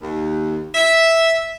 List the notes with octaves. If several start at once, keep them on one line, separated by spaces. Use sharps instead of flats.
D#2
E5